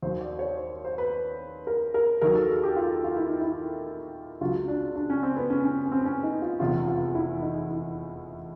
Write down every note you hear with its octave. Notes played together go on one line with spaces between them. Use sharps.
D#2 D#3 F#3 C5
D5
C#5
C5
C5
B4
A#4
A#4
D#2 D#3 F#3 A#4
A4
G#4
G4
F4
F4
E4
D#4
E4
C#2 C#3 F#3 F4
D4
D4
C#4
C4
B3
C#4
C#4
C#4
C4
C#4
D#4
F4
F1 E2 C3 F4
F4
E4
D#4
E4